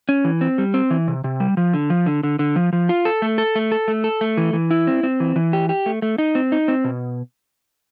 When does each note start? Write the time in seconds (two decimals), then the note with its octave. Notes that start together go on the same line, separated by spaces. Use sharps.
0.09 C#4
0.25 E3
0.41 C4
0.58 G3
0.74 C4
0.90 E3
1.08 C3
1.24 C3
1.40 G3
1.57 F3
1.73 D3
1.90 F3
2.06 D3
2.23 D3
2.39 D3
2.56 F3
2.73 F3
2.89 F4
3.05 A4
3.22 A3
3.38 A4
3.56 A3
3.72 A4
3.88 A3
4.04 A4
4.21 A3
4.37 E3
4.53 E3
4.71 E4
4.87 C4
5.03 C4
5.20 E3
5.36 E3
5.53 G4
5.69 G4
5.86 A3
6.02 A3
6.18 D#4
6.35 C4
6.52 D#4
6.68 C4
6.84 B2